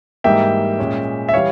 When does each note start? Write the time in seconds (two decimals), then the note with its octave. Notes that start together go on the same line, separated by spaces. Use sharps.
0.24 G#2 E3 G3 A#3 E5 G5
0.79 A#2 G#3 C#4
1.29 E5
1.34 E3 G3 C#5 F5